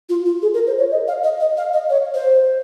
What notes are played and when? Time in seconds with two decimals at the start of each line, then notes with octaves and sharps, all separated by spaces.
0.09 F4
0.26 F4
0.42 G#4
0.54 A#4
0.67 C5
0.79 C#5
0.91 D#5
1.08 F5
1.24 D#5
1.40 D#5
1.57 F5
1.73 D#5
1.90 C#5
2.14 C5